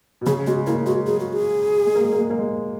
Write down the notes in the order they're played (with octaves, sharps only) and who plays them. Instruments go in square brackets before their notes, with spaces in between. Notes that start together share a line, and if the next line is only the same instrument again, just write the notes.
[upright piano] B2
[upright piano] C#3 [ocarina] G#4
[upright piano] G#3 [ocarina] F#4
[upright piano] A#3 [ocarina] E4
[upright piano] G#3 [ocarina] F#4
[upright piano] F#3 [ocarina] G#4
[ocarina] F#4
G#4
[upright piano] G#3
A#3
G#3
A#3
G#3
A#3
G#3